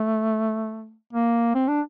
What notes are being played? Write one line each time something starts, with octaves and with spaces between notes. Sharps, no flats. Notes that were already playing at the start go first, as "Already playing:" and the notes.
Already playing: A3
A#3
C4
D4